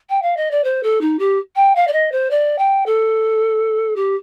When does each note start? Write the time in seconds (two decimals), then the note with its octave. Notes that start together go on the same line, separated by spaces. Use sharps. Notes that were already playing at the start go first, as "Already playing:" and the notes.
0.10 G5
0.22 F5
0.37 D#5
0.51 D5
0.64 C5
0.83 A4
1.01 D#4
1.19 G4
1.56 G5
1.76 F5
1.87 D5
1.93 D#5
2.12 C5
2.31 D5
2.58 G5
2.86 A4
3.96 G4